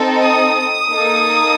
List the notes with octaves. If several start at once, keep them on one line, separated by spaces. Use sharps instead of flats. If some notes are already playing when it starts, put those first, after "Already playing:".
Already playing: C4 D#4 A4
D#6
A#3 D#4 A4